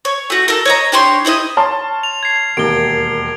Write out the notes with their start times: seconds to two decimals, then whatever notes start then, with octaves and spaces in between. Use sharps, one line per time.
0.05 C#5
0.30 A3 F#4
0.48 A4 A#4
0.65 C#5 D#5 A#5
0.92 D4 G4 C#5 C6
1.25 D#4 E4 C5 D#5
1.57 C#5 A5 C6 F6
2.03 F7
2.23 G#6 C7
2.57 E1 D#2 D7 G7